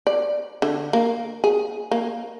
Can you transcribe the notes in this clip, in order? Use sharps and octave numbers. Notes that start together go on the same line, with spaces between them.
D5
D3
A#3
G#4
A#3